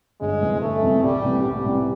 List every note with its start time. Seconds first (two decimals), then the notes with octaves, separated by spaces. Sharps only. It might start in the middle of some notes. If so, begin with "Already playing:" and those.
0.21 G1 G#3
0.41 F2 C3 E3
0.62 G1 A3
0.82 F2 C3 E3
1.03 C2 G3
1.23 C3 E3
1.45 C2 G3
1.65 C3 E3